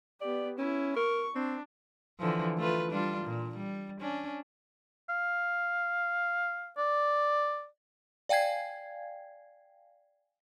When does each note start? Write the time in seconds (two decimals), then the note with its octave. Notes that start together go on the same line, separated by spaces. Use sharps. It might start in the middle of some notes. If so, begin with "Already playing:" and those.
0.21 B3 G4 D5
0.59 C#4 E4
0.96 A#4 C#6
1.35 C4 D4
2.19 D3 E3 F3
2.58 A3 F4 B4
2.90 G3 D4 F4
3.25 A#2
3.57 G3
4.01 C#4 D4
5.09 F5
6.78 D5
8.29 D5 F5 G5 G#5 G#6 C7